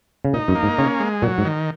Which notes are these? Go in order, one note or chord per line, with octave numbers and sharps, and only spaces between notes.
C#3
A#2 D#4
F#2
A#3
G#2
C#3 C#4
G#3
A#2 F#3
G#2
D#3